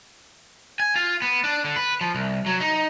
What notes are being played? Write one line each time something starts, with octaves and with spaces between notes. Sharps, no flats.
G#5
F4
B3
D4
D3
B4
F3
C2
F#3
D#4